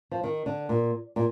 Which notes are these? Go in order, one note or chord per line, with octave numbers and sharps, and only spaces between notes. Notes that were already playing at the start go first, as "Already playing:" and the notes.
F3
D#3
D3
A#2
A#2